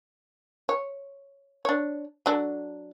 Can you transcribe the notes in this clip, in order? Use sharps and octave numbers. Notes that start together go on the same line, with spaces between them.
C#5
D4 C#5
F#3 D4 A4